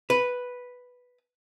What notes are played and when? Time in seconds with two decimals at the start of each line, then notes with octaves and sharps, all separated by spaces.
0.10 B4